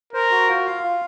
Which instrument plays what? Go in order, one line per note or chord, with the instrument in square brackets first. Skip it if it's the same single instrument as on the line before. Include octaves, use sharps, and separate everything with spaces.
[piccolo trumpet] A#4 [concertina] C5
[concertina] F#4
F4
F5
F4